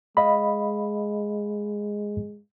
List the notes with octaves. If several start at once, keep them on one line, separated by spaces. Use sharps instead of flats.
G#3 D#5 F5 B5